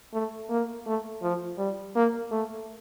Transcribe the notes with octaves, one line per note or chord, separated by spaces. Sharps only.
A3
A#3
A3
F3
G3
A#3
A3